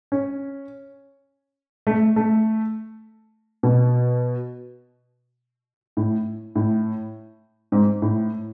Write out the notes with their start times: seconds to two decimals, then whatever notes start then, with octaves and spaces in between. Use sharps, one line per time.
0.12 C#4
1.87 A3
2.16 A3
3.63 B2
5.97 A2
6.55 A2
7.72 G#2
8.02 A2